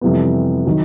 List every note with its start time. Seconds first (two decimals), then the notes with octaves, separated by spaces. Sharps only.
0.01 F2 C3 E3 G3 B3
0.65 D#3 F#3